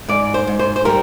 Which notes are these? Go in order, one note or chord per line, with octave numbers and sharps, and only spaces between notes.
G#2 D5
C5
G#2
C5
C5
G3 A#4